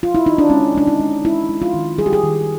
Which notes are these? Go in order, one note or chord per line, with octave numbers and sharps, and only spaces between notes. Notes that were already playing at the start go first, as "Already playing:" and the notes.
F4
E4
D#4
D4
G#3 C#4
G#3 D4
D#4
G#3
G#3 E4
G#3
F4
D#3
G3 G#4
G4
G#4
D#3